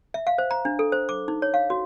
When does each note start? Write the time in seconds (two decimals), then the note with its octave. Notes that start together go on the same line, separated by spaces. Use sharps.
0.14 E5
0.27 F5
0.38 C5
0.51 A#5
0.65 D4
0.79 A4
0.92 C5
1.09 D6
1.28 D#4
1.42 C#5
1.54 F5
1.70 F#4